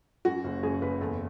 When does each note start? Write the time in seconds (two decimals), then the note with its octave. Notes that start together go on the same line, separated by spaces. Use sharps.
0.25 F#2 F#4
0.44 F#1
0.63 F#2 G#4
0.82 F#1 B4
1.01 E2 A4